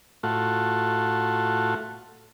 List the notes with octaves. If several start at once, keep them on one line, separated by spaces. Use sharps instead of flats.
A2 A3 F4 F#4